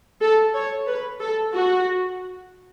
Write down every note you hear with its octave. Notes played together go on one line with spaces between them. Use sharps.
A4
C#5
B4
A4
F#4